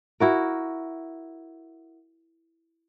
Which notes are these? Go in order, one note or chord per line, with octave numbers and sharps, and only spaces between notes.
E4 F#4 A#4